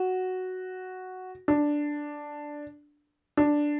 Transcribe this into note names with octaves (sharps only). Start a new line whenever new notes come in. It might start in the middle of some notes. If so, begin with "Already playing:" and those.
Already playing: F#4
D4
D4